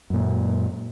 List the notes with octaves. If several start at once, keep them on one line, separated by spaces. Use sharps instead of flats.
F#2 A#2